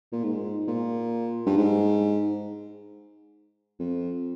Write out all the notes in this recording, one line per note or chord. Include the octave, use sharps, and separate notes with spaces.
A#2
G#2
A#2
G2
G#2
F2